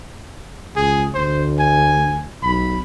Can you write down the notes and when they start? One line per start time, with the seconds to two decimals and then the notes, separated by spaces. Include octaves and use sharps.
0.76 C#2 G#4
1.14 D2 C5
1.59 G#5
2.43 B1 B5